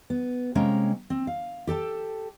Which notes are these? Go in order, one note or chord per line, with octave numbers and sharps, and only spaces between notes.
B3
C3 G#3 A#3 C#4 G5 A#5
C4
F5
G4 A4 G5 A5